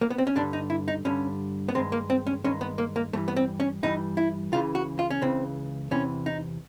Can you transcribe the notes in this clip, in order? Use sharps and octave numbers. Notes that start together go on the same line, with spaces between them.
A#3
B3
C4
C#4
G2 D3 G3 D4
D#4
E4
D#4
G2 D3 G3 C#4
B3
G2 D#3 G#3 C4
A#3
C4
C#4
G2 D#3 G#3 C#4
B3
A#3
A#3
G2 E3 G3 A3
B3
C4
C#4
G2 E3 G3 D#4
E4
C#2 C#3 E3 F4
F#4
F4
C#4
C#2 C#3 E3 C4
E2 C3 E3 C#4
D#4